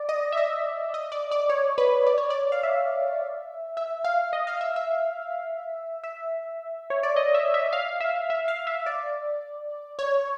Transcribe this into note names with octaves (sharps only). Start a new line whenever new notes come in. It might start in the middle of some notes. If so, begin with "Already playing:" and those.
Already playing: D5
D#5
E5
D#5
D#5
D5
D5
C#5
B4
D5
C#5
D5
F5
E5
E5
F5
D#5
F5
E5
E5
E5
C#5
D5
D#5
E5
E5
F5
E5
E5
F5
E5
D5
C#5